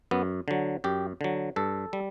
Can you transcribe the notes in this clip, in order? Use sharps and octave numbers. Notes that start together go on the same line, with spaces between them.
F#2 B3
D3 F#3
F#2 G4
D3 F#3
G2 A4
G3